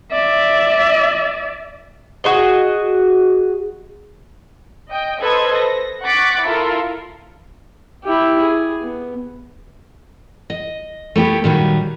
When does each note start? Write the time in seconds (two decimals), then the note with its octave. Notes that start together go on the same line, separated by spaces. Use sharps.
0.11 D5 E5
2.24 F#4 G#4 D#5
4.90 D#5 G5
5.21 A4 B4 C5 D#5 G#6
5.57 A#6
6.04 F#5 C#6 D6 F#6 A6 B6
6.44 E4 F4 A4 A#4
8.04 E4 G4
8.41 G#4
8.81 B3
10.50 D#5
11.16 A3 B3 G4 C#5
11.44 A#2 D#3 F#3 G3 D#4